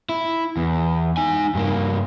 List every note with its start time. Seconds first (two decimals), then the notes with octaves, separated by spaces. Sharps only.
0.09 E4
0.57 E2
1.17 D#4 G#5
1.55 G2 A#3